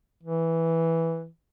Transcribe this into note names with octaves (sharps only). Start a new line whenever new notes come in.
E3